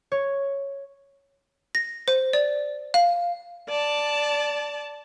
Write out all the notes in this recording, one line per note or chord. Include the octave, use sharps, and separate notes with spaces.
C#5
A#6
C5
D5
F5
D5 A5